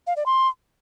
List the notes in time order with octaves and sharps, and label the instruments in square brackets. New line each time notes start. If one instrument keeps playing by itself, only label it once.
[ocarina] F5
D5
C6